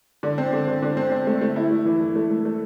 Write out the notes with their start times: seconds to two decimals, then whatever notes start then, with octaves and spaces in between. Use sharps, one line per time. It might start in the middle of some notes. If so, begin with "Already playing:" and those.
0.23 D3
0.38 C4
0.53 D3
0.68 D3
0.82 D3
0.97 C4
1.12 C4
1.27 A3
1.41 A3
1.56 E4
1.71 A3
1.85 E3
2.01 E3
2.15 A3
2.30 A3
2.45 A3